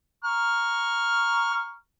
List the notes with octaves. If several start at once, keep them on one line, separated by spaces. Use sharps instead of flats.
A#5 C#6 F6